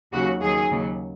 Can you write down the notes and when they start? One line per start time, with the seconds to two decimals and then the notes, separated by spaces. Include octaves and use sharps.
0.12 D#2 C#3 F#3 F#4
0.42 D#2 D#3 F#3 G#4
0.70 D#2 C#3 F#3